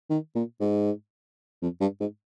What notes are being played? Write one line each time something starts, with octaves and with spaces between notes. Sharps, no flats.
D#3
A#2
G#2
F2
G2
G#2